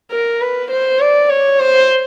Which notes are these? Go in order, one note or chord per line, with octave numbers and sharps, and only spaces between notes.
A#4
B4
C5
D5
C#5
C5